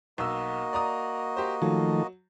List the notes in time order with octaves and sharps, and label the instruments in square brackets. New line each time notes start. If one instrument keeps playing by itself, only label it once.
[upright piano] B1 E6 [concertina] A#3 F#4 D#5
[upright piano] D5 A#5 D#6
G4 C5
[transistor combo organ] D#3 F3 A3 [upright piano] F#3